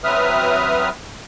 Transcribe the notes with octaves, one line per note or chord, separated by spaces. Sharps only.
F#3 C4 B4 E5 D#6 F6